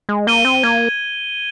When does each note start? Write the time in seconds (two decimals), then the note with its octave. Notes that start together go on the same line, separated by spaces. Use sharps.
0.09 G#3
0.27 A#3 D#7 G7
0.45 C4
0.63 A#3 G#6